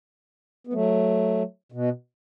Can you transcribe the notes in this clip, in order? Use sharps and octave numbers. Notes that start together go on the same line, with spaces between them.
B3
F#3 A3
B2